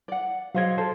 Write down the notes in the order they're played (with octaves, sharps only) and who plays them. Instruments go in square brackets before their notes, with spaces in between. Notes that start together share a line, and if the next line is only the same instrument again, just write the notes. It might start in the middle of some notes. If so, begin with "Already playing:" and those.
[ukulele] D5 F#5
[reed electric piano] F#3 C5 G#6 [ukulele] G#4 D#5 F5
[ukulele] A4 [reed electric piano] C5 A5